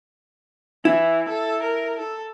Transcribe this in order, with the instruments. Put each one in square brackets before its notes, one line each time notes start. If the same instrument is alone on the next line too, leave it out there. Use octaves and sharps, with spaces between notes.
[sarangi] E3 [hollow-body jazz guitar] E4
[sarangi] A4
A#4
A4